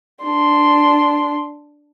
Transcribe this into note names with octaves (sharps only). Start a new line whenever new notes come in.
D4 C6